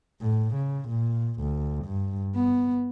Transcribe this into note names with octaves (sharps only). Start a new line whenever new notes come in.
A2
C#3
A#2
D2
G2
B3